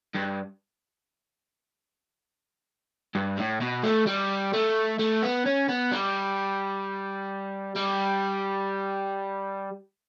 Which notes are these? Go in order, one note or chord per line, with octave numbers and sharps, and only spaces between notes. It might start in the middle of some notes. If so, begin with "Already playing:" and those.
G2
G2
A2
B2
A3
G3
A3
A3
B3
C#4
B3
G3
G3